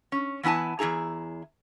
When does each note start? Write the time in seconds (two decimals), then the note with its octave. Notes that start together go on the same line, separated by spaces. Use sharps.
0.12 C#4
0.43 E3 B3 E4 G#5 A5
0.79 E2 C3 E4 G#4 A#5